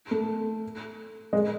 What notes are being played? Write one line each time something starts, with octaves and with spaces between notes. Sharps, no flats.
A3
G#3